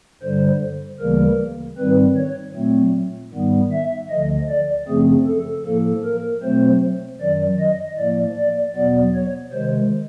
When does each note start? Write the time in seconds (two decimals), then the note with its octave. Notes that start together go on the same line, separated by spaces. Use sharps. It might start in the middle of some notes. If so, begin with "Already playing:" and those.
0.23 G2 D3 G3 C5
1.00 D2 C#3 E3 G3 A#3 A#4
1.78 G#2 D#3 G3 C4 B4
2.17 C#5
2.55 A#2 F#3 A3 C4
3.33 G#2 D#3 G3 B3
3.72 E5
4.10 D2 D3 F3 D#5
4.49 D5
4.87 F#2 C#3 F3 A3 C4 G#4
5.27 A4
5.65 A2 F3 A#3 A4
6.05 A#4
6.43 B2 F#3 A3 C4 C5
7.20 F#2 D#3 F#3 D5
7.60 D#5
7.98 A2 F3 A#3 D5
8.37 D5
8.75 E2 B2 F#3 B3 D5
9.15 C#5
9.53 C3 D#3 G#3 C5